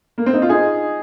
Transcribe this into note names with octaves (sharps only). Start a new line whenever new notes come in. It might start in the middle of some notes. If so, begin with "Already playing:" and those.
A#3
C4
D#4
F4
D#4 G#4